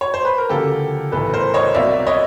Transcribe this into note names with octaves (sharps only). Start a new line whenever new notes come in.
C#5
C5
B4
A#4
D2 C#3 F3 A#3 G4 A4
B1 A2 E3 A3 A4 B4
A#4 C5
C#5 D#5
C2 B2 F#3 A#3 D5 E5
C#5 D#5